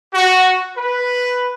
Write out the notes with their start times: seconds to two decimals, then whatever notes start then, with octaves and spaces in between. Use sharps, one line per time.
0.13 F#4
0.75 B4